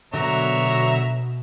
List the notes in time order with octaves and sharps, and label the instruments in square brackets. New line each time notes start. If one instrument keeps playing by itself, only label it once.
[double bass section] B2 [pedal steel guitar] D3 F#3 A#4 [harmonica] C#5 E5 A#5